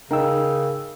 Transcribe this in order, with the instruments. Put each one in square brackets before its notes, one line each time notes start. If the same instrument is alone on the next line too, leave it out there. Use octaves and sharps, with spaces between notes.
[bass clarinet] C#3 [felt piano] D#4 [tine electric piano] A#4 G5 E6